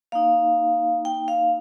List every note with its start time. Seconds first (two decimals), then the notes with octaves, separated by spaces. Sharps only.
0.12 A#3 D#4 F5
1.05 G5
1.28 F5